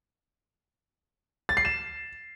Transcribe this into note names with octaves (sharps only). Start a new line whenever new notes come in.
A6
C7
E7